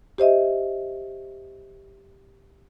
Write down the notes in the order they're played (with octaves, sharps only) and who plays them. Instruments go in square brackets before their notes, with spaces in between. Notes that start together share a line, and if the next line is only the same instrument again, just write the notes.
[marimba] G4 C5 D#5 E5